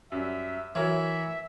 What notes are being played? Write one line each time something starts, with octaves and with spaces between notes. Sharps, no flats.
F#2 G3 E5
E3 F#3 A#4 C#5 E5